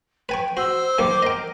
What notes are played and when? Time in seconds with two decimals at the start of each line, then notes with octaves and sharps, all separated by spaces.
0.29 B4 G5 G#5 C#6
0.57 F#4 C5 E6
0.99 D#3 G3 A#3 D6
1.23 A#4 D#5 G5